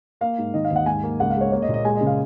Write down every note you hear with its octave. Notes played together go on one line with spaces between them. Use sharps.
A#3 F5
G#2
D#3 D#5
F5
D#2
F#5
G#2 G#5
A#3
C#2 F#5
F5
G#3 C#5
A#3 C#5
D#5
A#2
D#5
G#3 G#5
D#5
C#3
F5